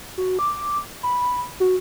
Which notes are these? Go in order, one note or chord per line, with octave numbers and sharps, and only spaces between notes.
F#4
D6
B5
F#4